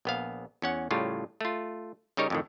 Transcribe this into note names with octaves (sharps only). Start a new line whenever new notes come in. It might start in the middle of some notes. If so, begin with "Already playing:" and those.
A#1 B3 F5
E2 C#4 F#5
A2 C#3 G3 F4
A3 F4
C#3 G3 D#4 A#4 C#5
F2 A2 D#3